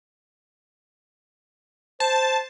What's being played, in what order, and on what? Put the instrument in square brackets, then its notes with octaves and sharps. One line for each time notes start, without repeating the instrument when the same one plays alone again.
[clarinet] C5 [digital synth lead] A5